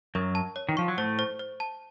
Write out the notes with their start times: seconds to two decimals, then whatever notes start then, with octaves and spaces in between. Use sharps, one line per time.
0.15 F#2 F#3 A#4
0.35 A5
0.56 C#5
0.69 D#3
0.77 F3 C#6
0.88 F#3
0.97 A2 A3 C5
1.19 C5
1.39 C5
1.60 A5